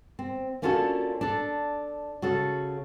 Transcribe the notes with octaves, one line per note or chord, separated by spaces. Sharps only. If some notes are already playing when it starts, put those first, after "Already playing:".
C4
A#3 C#4 D4 F4 F#4 A4
D4 A4
C#3 F#4 A4